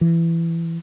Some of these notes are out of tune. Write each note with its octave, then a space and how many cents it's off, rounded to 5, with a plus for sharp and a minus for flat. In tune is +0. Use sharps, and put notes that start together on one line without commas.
E3 +20